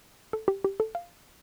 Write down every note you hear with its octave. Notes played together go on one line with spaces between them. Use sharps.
A4
G4
G4
A4
F5